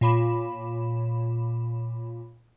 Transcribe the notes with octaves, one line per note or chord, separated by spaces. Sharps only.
A#2 F4 C#5 B5 D6 E7